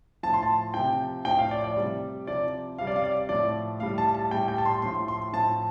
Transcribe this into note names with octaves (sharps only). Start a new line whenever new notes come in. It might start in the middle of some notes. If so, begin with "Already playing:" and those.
A2 F3 A5
C6
A5
C3 F3 G5
A2 F3 G5
F5
D5
D5
C3 G3
C3 F3 D5
C3 G3 F5
D5
F5
D5
A2 F3 D5
A2 G3 F5
A5
A5
A2 G3 G5
G5
A5
C6
A2 F3 C6
C6
A2 F3 A5